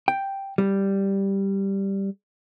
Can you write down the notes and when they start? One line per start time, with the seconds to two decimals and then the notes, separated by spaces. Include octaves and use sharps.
0.08 G5
0.58 G3